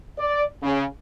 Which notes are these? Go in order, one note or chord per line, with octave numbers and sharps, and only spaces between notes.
D5
C#3